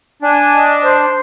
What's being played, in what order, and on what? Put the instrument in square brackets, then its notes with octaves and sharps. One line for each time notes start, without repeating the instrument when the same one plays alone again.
[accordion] D4 [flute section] G#5
[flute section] D#5
C5